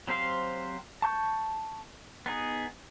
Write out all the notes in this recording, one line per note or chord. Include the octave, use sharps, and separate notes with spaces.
F#3 C4 G4 C5 F5
A5 C#6 G6
B3 D#4 G#4